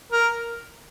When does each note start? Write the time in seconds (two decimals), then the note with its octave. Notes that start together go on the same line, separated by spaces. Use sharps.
0.12 A#4